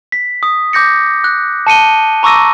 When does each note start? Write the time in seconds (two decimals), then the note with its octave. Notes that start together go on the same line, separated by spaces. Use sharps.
0.12 B6
0.43 D#6
0.73 D6 G6 A#6 C#7
1.24 F#6
1.67 A5 C#7 D#7 G7
2.23 A#5 C#6 D6 E6 A#6 D#7